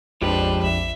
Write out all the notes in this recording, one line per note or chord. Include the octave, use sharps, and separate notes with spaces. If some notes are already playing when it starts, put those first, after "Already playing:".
A#1 F2 F3 G#3 D4 G4 B4 C5
A#1 E5